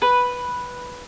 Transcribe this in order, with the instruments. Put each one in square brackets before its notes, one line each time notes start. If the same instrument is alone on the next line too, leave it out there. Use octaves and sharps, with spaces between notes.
[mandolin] B4